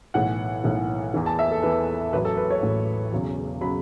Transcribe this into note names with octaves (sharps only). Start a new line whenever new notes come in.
B1 A2 E3 F#5
B1 A2 E3
E2 E3
A5
E5
A4
E2 E3 B4
A1 A2 F#3 B4
A4
B4
C#5
A1 A2 F#3
E1 E2 C#3 F#3
C#3 F#3 B5